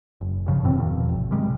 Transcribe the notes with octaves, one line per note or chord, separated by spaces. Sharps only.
F#1
G2 C#3 F3
F#2 B2 E3 C4
E2 B2 D#3 F3
G#1
C3 D#3 G3 G#3